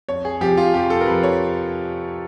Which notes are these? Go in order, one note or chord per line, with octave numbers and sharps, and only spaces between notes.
F2 C#5
G#4
C3 F3 G4
F4
F2 G4
A4
A#4
C3 F3 B4
C#5